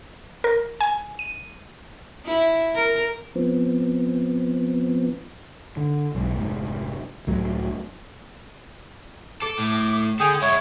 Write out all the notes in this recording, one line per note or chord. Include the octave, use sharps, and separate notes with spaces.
A#4
G#5
D#7
E4
A#4
F3 B3 C4
D3
B1 G#2
F1 G#2
C#2 A2 F#3
A4 D6
A2
D3 G#4 G5 D#6
G#3 E4 C#5